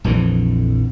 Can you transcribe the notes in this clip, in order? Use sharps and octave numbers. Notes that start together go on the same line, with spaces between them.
A#1 F2 D3 E3